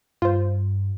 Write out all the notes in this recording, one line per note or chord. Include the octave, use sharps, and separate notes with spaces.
G2 F4 C5